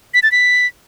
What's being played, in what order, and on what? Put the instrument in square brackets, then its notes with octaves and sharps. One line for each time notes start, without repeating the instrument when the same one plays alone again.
[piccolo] B6
A6
B6